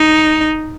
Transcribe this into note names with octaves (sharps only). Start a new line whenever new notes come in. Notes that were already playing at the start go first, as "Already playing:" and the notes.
Already playing: D#4